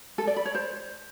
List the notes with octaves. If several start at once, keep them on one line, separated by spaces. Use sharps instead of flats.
A4
D5
B5
C#5
C5